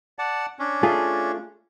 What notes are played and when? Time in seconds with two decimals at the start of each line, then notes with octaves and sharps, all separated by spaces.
0.19 D5 F#5 A5
0.59 C#4 D4
0.83 A3 F4 G#4